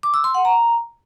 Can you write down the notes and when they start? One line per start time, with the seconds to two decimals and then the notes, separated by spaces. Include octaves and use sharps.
0.03 D6
0.14 E6
0.24 C6
0.35 F#5
0.45 A#5